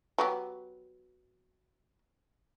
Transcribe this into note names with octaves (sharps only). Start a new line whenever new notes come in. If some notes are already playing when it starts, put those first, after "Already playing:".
F#3 B3 G4